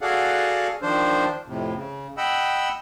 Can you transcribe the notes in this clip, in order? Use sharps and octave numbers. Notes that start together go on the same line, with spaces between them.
F#4 G#4 A4 D5 F5 F#5
D#3 F3 D4 C5
F2 A2 C3
C#3
D#5 F#5 G5 B5 E6